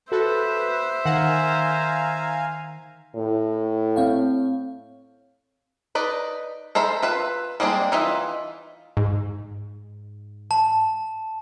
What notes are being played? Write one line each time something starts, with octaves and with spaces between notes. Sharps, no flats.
F#4 A4 B4 C5 E5
D#3 F5 F#5 G#5 A#5
A2
C4 C#5 F5
D#4 B4 D5
A4 A#4 C5 E5 B5
F4 B4 E5
G3 G#3 A#3 C4 D4
E3 D#4 F4 E5
G#2
A5